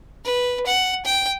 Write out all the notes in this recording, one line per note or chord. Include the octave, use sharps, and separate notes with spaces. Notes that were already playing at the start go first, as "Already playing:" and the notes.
B4
F#5
G5